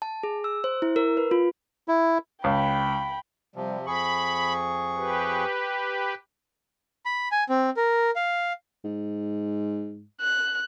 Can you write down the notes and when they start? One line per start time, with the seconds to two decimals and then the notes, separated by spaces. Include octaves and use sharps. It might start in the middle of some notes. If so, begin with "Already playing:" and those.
0.02 A5
0.23 G#4
0.44 E6
0.64 C5
0.82 E4
0.96 A#4
1.17 B4
1.31 F4
1.88 E4
2.44 C#2 G5 B5
3.56 C3 F3 G3
3.86 F2 G#4 B5 C#6
4.97 G4 B4
7.05 B5
7.32 G#5
7.49 C4
7.77 A#4
8.16 F5
8.84 G#2
10.21 F#6